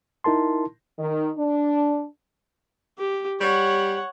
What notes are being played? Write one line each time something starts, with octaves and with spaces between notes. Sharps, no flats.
D#4 E4 A#4 A5 C6
D#3
D4
G4
G3 C#5 F#5